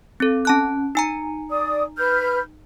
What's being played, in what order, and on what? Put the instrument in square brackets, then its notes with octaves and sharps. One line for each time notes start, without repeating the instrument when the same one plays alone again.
[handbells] C4 A4
C#4 A5 F#6
D#4 G#5 A#5
[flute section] D5 D#6
B4 F6 G6